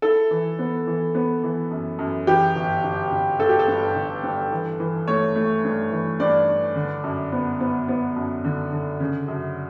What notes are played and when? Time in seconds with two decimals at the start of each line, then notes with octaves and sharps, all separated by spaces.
0.02 E4 A4
0.31 E3
0.59 B3
0.87 E3
1.15 B3
1.43 E3
1.71 F#2
1.99 F#2
2.27 E3 G4
2.55 G1
2.83 G1
3.11 G1
3.39 G1 A4
3.49 G4
3.59 A4
3.68 G2
3.95 G1
4.23 G2
4.52 E3
4.80 E3
5.08 A3 C#5
5.36 A3
5.64 G2
5.92 E3
6.20 G2 D5
6.48 D4
6.76 D3
7.04 F#2
7.32 B3
7.60 B3
7.88 B3
8.16 F#2
8.44 D3
8.72 D3
9.00 C#3
9.28 F#2